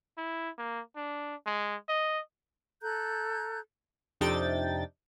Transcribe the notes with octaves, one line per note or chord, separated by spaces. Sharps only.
E4
A#3
D4
G#3
D#5
A4 A#5 F#6 G6
F2 C3 D4 D#4 G5 A6